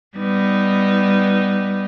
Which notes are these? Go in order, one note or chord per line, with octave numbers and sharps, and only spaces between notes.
G3 B3 D#4